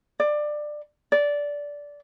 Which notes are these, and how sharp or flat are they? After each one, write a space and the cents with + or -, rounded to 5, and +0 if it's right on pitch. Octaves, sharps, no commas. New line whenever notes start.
D5 +20
D5 -15